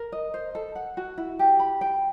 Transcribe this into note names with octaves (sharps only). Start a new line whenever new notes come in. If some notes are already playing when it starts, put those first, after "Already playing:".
Already playing: A#4
D#5
C5
A4
F#5
F#4
E4
G4
B5
G5